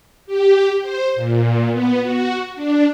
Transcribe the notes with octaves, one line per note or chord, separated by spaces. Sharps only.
G4
C5
A#2
B3
F#4
D4